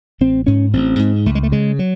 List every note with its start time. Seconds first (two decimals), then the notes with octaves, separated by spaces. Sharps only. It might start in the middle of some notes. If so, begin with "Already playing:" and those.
0.21 A1 C4
0.47 G#2 C#4
0.73 A1 C4
0.99 G#2
1.26 C#2 A3
1.35 G#3
1.43 A3
1.52 C#3 G#3
1.79 F#3